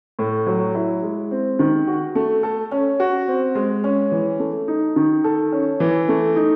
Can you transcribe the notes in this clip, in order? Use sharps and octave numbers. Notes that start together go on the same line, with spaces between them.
A2
F#3
E4
G#3
C4
D#3
F#4
A3
A4
C#4
F#4
C4
G#3
C#4
E3
A3
D#4
D#3
A4
C#4
E3
A3
D#4